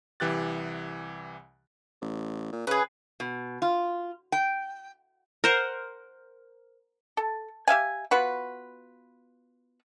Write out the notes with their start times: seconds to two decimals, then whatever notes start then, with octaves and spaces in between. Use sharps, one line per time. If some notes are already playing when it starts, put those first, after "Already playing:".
0.20 C2 E3 G4 F#6 A6
2.02 A1
2.53 A#2
2.67 C#3 G#4 B4
3.20 B2
3.62 F4
4.32 G5
5.44 A#4 C5 F#5
7.17 A4
7.68 G4 E5 F5 G#5
8.11 B3 F4 F#4 B4